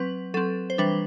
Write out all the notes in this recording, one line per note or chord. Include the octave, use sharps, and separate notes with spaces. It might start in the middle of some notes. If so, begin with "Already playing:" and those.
Already playing: F#3 C4 B4
F#3 C4 A4
C5
E3 G3 D4 B4